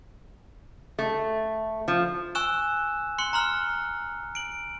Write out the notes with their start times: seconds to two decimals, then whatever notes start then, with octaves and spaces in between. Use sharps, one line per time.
0.99 A3
1.88 F3
2.35 G#5 C#6 E6 F#6 E7
3.19 C6 F#6 C#7 G7
3.33 A#5 C6 F6
4.35 D7 F#7